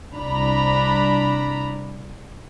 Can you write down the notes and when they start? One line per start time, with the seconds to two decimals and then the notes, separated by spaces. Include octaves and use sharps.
0.13 C2 D4 A#5 B5